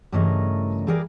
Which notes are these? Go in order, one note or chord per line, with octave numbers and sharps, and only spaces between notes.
G2 C#3 E3 A3 A#4 D#5
E3 G3 G#4 A#4 D5